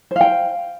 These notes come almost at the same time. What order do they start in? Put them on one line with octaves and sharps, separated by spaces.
C5 F5 G5